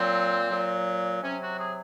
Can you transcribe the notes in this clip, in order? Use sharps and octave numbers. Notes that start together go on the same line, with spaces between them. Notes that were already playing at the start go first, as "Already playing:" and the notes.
Already playing: A#2 F#3 C4
A#2 F#3
C3 F#3 C#4
F#4
G#4